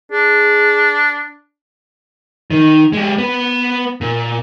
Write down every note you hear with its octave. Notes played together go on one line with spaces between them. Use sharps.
D4 G#4
D#3
G#3 G4
B3 B4
A#2